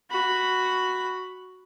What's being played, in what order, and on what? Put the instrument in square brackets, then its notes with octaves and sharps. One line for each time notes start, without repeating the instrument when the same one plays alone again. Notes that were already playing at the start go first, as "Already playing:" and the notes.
[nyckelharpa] F#4 B5